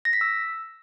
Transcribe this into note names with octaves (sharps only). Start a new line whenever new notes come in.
A#6
B6
E6